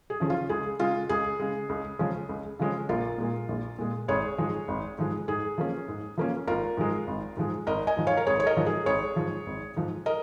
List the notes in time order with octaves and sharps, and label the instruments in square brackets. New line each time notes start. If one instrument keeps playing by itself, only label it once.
[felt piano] G#4
C#3 F3 C#4
F4
C#2 G#4
C#3 G#3 F4
C#2 G#4
C#3 G#3
C#2
C#3 F3 G#3 C#4
C#2
C#3 F3 G#3 C#4
A#1 F4 A#4
A#2 G#3
A#1
A#2 G#3
G#1 G#4 C#5
G#2 F3 G#3
G#1
G#2 F3 G#3
G#2 G#4
F3 A#3 C#4
G#2
F3 A#3 C#4
G#1 F4 A#4
G#2 F3 G#3
G#1
G#2 F3 G#3
G#1 A#4 D#5
D#5 G#5
G#2 F3
C#5 F5
A#4
G#1 G#4 C#5
C#5
A#4 D#5
G#2 F3
G#4
G#1 G#4 C#5
G#2 F3
G#1
G#2 F3
A#4 D#5